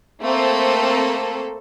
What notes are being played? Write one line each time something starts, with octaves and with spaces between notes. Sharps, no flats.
A3 A#3 C4 A4